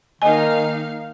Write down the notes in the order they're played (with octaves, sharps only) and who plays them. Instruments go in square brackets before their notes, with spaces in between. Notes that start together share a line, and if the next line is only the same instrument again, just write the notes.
[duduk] D#3 [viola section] A#3 D#4 F5 [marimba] D#5 G#5